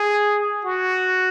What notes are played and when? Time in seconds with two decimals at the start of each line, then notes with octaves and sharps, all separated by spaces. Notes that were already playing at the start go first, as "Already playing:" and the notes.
Already playing: G#4
0.65 F#4